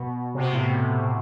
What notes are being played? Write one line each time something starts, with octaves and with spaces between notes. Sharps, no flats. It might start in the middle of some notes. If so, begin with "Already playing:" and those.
Already playing: B2
C3
B2
A2